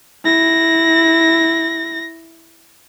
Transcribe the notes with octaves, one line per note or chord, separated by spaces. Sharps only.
E4 A#6